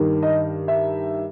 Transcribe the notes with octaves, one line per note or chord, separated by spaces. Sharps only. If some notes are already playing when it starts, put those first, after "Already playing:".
Already playing: G2 D#3
D#5
E5